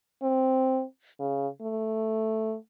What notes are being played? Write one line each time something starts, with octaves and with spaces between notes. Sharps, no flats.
C4
C#3
A3